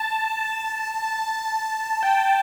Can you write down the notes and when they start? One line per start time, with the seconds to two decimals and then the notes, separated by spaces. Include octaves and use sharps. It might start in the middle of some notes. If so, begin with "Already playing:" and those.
Already playing: A5
2.03 G5